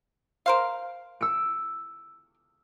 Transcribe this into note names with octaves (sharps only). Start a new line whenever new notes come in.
A#4 C5 F5
E6 C#7 D7